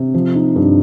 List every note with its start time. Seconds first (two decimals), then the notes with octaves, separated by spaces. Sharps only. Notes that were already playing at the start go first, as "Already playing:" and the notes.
Already playing: C3
0.14 F3
0.35 D#4
0.56 G2